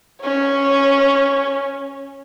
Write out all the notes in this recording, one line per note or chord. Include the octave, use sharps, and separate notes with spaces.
C#4 C#5